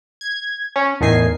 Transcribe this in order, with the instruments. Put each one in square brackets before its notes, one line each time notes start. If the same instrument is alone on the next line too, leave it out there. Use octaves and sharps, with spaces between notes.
[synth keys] G#6
C#4
E2 A2 D#3 D#4 G#5 C7